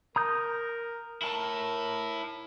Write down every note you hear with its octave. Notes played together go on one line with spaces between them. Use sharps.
A#4 A#5 D#6 G6
E4 A#4 A5